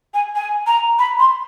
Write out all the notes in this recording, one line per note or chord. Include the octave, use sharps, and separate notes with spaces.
G#5
G#5
A#5
B5
C6